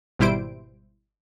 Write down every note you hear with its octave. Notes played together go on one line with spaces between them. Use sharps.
G#1 B2 G3 E4 C5 D7